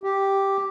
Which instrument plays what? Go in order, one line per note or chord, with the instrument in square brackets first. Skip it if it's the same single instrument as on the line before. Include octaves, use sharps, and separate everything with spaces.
[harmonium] G4